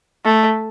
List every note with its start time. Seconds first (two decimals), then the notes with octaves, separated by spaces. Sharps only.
0.25 A3